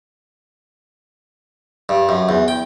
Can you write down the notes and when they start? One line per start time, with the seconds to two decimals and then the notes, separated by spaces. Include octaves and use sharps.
1.89 G2
2.09 F#2
2.29 E2
2.48 G5